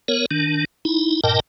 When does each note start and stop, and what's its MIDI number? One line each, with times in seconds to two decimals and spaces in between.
0.08 0.26 59
0.08 0.26 70
0.08 0.26 73
0.31 0.65 51
0.31 0.65 62
0.85 1.21 63
0.85 1.21 64
1.24 1.40 43
1.24 1.40 46
1.24 1.40 70
1.24 1.40 75
1.24 1.40 79
1.24 1.40 81